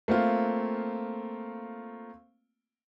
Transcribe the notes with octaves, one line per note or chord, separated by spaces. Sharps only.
A3 A#3 C4 F4